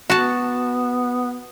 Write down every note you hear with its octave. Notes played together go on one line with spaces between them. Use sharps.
B3 F#4 A5